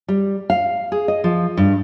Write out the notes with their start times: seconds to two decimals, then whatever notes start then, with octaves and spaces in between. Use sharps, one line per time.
0.08 G3
0.50 F5
0.92 G#4
1.08 D#5
1.24 F3
1.57 G2